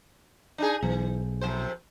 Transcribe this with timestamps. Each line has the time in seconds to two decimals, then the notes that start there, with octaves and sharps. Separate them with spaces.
0.58 D4 D#4 G#4
0.82 B1 E3
1.41 F2 C3 C5